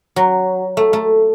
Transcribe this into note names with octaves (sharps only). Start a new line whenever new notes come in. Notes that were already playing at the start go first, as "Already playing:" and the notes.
F#3
A3
A3